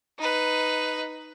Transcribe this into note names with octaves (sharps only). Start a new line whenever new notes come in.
D#4 B4